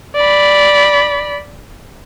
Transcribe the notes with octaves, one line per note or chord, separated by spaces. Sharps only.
D5 B5